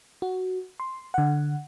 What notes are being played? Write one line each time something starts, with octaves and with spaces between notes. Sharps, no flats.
F#4
C6
D3 F#5